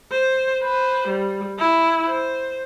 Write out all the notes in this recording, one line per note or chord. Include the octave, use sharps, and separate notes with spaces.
C5
B4 C5
G3
E4
C5